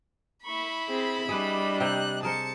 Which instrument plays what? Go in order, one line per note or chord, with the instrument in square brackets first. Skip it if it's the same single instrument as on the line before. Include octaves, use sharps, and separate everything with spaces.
[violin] E4 B5 [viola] C#6
[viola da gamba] C4 [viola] G#4
[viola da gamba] G3 [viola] D4 D#5 [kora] G#4 B4
[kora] C3 G4 G5 [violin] F#6
[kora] G#4 A#4 C5 [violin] A5 C#7